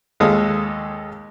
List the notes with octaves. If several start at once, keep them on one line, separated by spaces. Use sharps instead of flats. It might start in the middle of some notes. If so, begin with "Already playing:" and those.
D#2 G#3 A4 F5 D#6